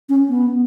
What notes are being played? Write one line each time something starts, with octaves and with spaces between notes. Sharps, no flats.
C#4
B3